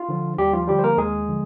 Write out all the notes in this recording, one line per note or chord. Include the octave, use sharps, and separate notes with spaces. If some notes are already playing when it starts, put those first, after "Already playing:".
Already playing: F4
D3 F3
D#2 G3 G4
F3 F4
D3 F3 G3 G4
C5
A#3 A#4
D#2 G#3 G#4
D3 F3